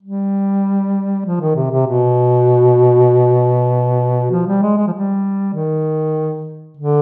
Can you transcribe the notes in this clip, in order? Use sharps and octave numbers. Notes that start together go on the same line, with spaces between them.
G3
F3
D#3
C3
C3
B2
F3
G3
G#3
G#3
F3
G3
D#3
D3